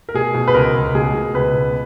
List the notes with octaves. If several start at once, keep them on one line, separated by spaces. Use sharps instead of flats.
A#4
B2 G#4
B2
B4
C#2 A#4
C#2
B2 G#4
B2
C#2 B4
B2